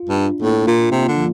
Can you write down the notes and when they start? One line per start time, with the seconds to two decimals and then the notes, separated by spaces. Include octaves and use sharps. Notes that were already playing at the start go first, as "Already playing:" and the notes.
Already playing: F4
0.09 G2
0.17 D4
0.42 A2 A#3
0.67 A#2 F4
0.91 C3 A#3
1.08 D3
1.16 F3